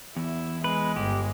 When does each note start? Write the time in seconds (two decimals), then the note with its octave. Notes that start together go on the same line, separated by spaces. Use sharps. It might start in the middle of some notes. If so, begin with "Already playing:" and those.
0.16 E2 E4
0.64 G#3 B4
0.96 G1 G4